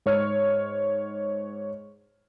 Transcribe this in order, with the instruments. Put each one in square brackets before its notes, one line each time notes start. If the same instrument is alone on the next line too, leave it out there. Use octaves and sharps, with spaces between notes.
[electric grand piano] G#2 C#5 F6